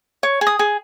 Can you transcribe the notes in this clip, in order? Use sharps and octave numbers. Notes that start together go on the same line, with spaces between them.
C#5
G#4
D#6
G#4